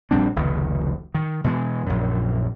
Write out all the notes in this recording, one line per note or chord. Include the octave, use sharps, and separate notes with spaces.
A#1 G3 C4 D4
F1 C#2 D#3
D#3
B2 E3 F3 G#3
A#1 F#2